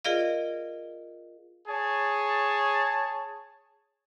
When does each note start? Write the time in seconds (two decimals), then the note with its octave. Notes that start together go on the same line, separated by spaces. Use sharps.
0.05 F4 G#4 A#4 D5 D#5 F5
1.68 G#4 C#5 A5